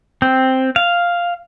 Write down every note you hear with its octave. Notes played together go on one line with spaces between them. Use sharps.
C4
F5